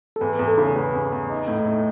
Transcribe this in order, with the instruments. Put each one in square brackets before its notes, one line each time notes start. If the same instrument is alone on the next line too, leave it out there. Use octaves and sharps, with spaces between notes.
[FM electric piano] A4
[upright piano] E2 [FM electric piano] B4
[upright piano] E2
[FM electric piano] A4
[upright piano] C#3
[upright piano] E2 [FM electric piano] B4
[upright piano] E2
E2
D#4
A2
A3